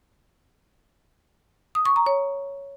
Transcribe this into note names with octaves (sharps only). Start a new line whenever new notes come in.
D#6
C#6
A#5
C#5